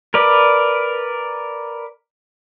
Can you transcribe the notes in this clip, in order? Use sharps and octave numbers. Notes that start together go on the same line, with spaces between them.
A#4 B4 D5